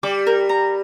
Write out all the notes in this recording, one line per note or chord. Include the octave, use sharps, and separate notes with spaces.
G3 D6
A#4
A#5